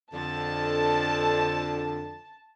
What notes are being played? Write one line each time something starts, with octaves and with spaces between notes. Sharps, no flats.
F2 D3 A5